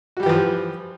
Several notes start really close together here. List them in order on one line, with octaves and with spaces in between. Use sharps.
F#4 G3 G4 E3 F3